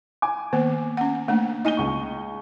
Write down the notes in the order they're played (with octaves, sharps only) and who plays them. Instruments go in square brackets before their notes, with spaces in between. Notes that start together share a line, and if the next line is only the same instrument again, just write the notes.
[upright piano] G#5 D6
[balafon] D#3 A#3 B3
C#4 F#5
A3 A#3 D4
[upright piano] D#4 D#7 G7 [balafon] D#5 G#5
[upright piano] C#2 C#6